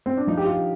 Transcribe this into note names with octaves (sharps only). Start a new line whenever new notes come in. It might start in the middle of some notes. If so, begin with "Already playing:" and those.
C4
D4
F3 D#4
G4
F4